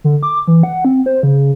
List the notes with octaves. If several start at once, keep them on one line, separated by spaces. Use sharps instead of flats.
D3
D6
E3
F#5
C4
C5
C#3